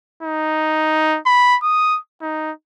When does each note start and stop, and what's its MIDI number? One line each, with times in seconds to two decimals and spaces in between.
0.23 1.19 63
1.26 1.57 83
1.63 1.99 87
2.22 2.52 63